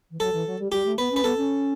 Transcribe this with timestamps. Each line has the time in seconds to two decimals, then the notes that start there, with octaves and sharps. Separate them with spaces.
0.11 E3
0.19 F#3 A4
0.32 E3
0.46 F#3
0.59 G3
0.72 G3 G4
0.85 A3
0.98 B3 B4
1.11 C#4
1.16 B4
1.24 B3 A4
1.37 C#4